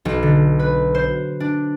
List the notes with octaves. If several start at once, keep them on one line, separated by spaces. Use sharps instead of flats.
B1
D3
B4
C5
D4